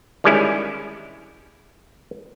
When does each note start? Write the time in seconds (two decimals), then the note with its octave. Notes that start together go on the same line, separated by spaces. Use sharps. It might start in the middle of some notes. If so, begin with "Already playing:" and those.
0.24 D3 D#3 G3 G#3 C#4 E4